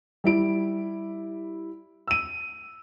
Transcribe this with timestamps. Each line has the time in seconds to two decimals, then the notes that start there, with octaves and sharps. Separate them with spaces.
0.24 G3 E4 D7
2.08 E6 D#7